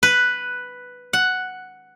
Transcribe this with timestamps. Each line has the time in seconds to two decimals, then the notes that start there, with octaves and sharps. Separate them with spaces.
0.03 B4
1.13 F#5